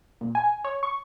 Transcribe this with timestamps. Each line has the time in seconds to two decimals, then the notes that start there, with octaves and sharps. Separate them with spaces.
0.21 A#2
0.35 G#5
0.64 C#5
0.83 C#6